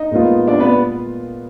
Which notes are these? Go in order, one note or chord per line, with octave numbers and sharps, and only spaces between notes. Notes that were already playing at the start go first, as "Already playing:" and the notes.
Already playing: D#4 D#5
A#2 G#3 B3 F4
D4 D5
B3 B4